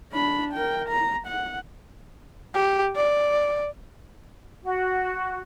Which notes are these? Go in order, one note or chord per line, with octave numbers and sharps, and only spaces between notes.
D4 B5
A#4 G5
A#5
F#5
G4
D5
F#4